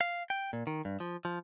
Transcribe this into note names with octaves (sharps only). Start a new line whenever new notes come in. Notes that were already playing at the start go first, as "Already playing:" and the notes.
F5
G5
A#2
D#3
G2
F3
F3